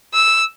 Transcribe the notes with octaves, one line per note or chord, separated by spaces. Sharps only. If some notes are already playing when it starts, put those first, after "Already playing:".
E6